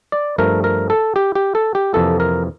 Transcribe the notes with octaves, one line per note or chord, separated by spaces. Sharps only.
D5
G2 F3 A3 A#4
A#4
A4
G4
G4
A4
G4
F2 C3 E3 A#3 A4
A#4